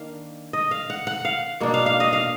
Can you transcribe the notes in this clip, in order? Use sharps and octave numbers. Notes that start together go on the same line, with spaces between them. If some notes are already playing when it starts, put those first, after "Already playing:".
Already playing: D#3 A#3 D4 F5
D#5
F5
F#5
F#5
F5
B2 A#3 D4
F5
F5
D#5
F5